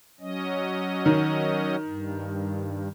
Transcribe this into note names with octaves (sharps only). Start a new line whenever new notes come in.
F#3 C#4 D#5
D#3
G2